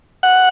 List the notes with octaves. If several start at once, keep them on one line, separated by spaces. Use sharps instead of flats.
F#5